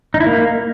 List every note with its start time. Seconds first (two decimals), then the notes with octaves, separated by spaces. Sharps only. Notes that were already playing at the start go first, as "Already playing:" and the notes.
0.14 D#4
0.20 E4
0.27 A#3